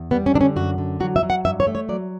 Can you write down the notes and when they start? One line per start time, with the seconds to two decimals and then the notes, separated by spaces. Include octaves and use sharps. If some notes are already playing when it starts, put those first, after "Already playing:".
Already playing: E2
0.11 G3 B3
0.26 C#4
0.34 D3 D4
0.41 C#4
0.56 F#2 F#4
0.78 D3
1.00 F#3 F#4
1.16 E5
1.23 F#3
1.30 F#5
1.45 G2 E5
1.60 C#5
1.67 A3
1.75 C#5
1.89 F#3 D5